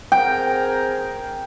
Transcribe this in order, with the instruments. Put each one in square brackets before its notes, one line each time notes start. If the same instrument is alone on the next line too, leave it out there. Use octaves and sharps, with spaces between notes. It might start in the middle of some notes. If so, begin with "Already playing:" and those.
[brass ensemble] C4 G#4 A#4 [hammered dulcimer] G5